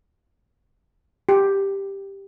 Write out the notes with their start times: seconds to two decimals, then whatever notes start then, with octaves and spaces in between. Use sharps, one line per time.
1.29 G4